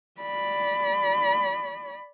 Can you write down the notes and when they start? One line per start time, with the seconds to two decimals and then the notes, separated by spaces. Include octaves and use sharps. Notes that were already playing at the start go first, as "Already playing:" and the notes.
0.21 D5 B5